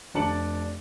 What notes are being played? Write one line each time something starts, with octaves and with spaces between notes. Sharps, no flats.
F1 D4 A5 C#7 F#7